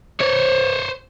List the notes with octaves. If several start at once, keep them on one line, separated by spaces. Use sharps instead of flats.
C5 C#5